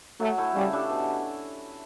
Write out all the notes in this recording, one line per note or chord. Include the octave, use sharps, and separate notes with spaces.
F#3 A3
A3 E4
C#3 G3
G3 D4 A4
B2